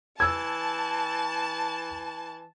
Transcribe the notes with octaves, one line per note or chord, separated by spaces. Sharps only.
E3 A5 E6 G#6